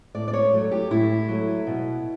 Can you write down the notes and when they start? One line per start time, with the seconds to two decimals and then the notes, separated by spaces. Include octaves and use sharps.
0.14 A2 D5
0.28 D5
0.33 C#5
0.53 F#3 A3
0.71 G4
0.91 A2 E4
1.28 F#3 A3
1.67 B2